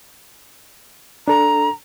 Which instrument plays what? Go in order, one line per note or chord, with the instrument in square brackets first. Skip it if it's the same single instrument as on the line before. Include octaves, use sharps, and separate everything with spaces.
[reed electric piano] D4 A4 [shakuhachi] A#5